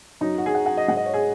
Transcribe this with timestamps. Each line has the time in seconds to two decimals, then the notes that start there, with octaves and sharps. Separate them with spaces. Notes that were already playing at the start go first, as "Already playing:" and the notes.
0.21 F#2 F#3 D#4
0.38 F#4
0.46 G#4
0.55 F#5
0.66 F#5
0.77 D#5
0.88 G#2 G#3 F#5
0.97 D#5
1.06 C#5
1.14 G#4